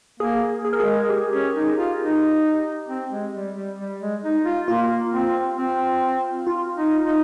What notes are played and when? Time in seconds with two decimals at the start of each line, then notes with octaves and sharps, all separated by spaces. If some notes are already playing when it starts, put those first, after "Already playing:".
0.20 A#3 G#4
0.65 G#4
0.73 A#4
0.80 G#3 G#4
1.10 G4
1.32 C#4
1.54 D#4
1.77 F4
1.99 D#4
2.89 C4
3.11 G#3
3.34 G3
3.55 G3
3.79 G3
4.00 G#3
4.23 D#4
4.45 F4
4.68 A#3 F4
5.12 C4
5.58 C4
6.47 F4
6.77 D#4
7.06 D#4